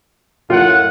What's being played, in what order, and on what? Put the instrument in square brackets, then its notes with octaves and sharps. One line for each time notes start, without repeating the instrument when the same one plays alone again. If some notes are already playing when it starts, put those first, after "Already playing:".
[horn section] F#2 A2 F#5 [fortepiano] F4